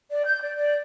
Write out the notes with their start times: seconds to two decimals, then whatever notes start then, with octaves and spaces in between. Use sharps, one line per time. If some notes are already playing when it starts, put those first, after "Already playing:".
0.10 D5
0.26 G6
0.42 D5
0.55 D5